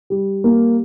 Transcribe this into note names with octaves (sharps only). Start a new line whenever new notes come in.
G3
A#3